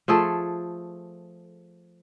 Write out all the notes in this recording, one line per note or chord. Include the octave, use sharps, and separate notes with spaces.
F3 A3 G#4 A4